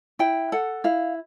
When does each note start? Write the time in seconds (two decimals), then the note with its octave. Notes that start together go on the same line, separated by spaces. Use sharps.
0.19 E4 G5
0.52 A4 F#5
0.84 E4 F5